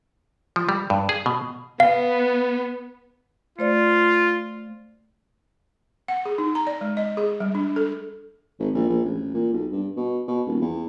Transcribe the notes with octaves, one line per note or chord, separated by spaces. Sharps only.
F3
G3
G2
G#4
B2
B3 F5
A3 F4 C5 D5
F#5
G#4
D#4
A#5
D5
G#3
D#5
G#4
G3
D4
A4
G#1
A#1
A#1
A1
A#2
B1
G2
B2
B2
D#1
E2